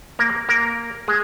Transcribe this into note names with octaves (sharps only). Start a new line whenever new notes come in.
A#3 A#4
A#3 A#4
G#3 G#4